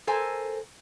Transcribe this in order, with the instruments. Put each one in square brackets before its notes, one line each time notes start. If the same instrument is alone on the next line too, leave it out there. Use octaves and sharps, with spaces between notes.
[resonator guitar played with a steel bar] A4 A#4 C5 G#5